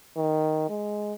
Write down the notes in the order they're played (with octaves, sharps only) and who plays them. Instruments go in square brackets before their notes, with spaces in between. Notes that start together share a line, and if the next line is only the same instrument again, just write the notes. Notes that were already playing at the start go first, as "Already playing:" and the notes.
[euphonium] D#3
G#3